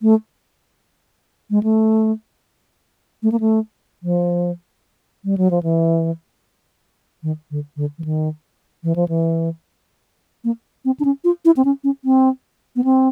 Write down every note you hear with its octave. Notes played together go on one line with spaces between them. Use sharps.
A3
G#3
A3
A3
A#3
A3
F3
G3
F#3
F3
E3
D#3
D3
D3
E3
D#3
E3
F3
E3
A#3
C4
D4
C#4
F4
E4
C4
C#4
C#4
C4
B3
C4